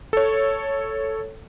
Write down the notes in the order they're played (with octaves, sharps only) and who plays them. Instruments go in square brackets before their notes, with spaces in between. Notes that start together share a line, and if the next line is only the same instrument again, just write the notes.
[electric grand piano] A4 C#5